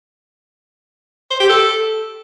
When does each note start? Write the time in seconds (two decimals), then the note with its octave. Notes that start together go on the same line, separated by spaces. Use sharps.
1.30 C5
1.40 G4
1.49 A4